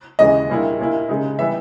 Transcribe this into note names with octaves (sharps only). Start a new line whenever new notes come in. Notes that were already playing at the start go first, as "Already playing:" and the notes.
D#2 C#3 E3 G#3 D#5
A#2 G3 A#3 E4
A#2 A#3 E4
C#3 G#3 D#4
E3 G3 B3 E5